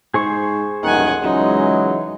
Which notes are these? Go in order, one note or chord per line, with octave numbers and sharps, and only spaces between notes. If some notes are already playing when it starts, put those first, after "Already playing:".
G#2 G#4 C5 C#6
D#1 A1 F#2 D#3 F#5 G#5
C#2 E3 F#3 G#3 D#4